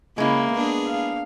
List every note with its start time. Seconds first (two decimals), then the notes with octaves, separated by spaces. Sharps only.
0.18 C#3 G#3 A#3 E4
0.53 B3 D4 G#4
0.86 F5